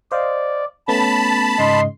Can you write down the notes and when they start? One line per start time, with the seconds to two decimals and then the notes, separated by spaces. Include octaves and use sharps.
0.12 C5 D5 D#5 F5
0.88 A3 B3 C#4 A5 B5 A6
1.59 G#2 C#3 D#5 C6